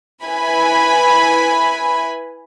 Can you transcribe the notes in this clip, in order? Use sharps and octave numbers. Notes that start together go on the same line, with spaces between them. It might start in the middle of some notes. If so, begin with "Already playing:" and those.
E4 B4 G#5 B5